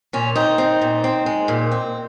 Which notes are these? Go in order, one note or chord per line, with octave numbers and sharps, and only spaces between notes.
A#2 C#4
C4 D#4
C4
A#2
C4
G#3
A#2
C4